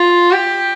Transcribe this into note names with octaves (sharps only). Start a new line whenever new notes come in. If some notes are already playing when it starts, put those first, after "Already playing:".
Already playing: F4
G4